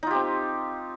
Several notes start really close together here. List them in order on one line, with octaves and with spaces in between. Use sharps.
D#4 F4 G4 C4